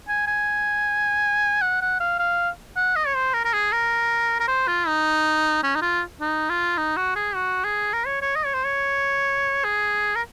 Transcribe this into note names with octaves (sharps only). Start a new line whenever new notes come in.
G#5
G#5
F#5
F#5
F5
F5
F#5
D#5
C#5
C5
A#4
A#4
G#4
A#4
A#4
C5
F4
D#4
C#4
D#4
F4
D#4
F4
D#4
F#4
G#4
F#4
G#4
A#4
C#5
C#5
D#5
C#5
C5
C#5
G#4
A#4